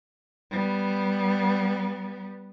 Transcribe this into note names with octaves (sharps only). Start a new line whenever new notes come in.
G3 B3